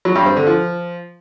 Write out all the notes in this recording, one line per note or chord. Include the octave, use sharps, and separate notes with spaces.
F#3
G2
C4
D3
F3